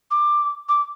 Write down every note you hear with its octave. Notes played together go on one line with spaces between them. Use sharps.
D6
D6